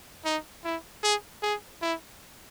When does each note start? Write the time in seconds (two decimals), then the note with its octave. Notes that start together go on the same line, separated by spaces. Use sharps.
0.25 D#4
0.65 E4
1.03 G#4
1.42 G#4
1.82 E4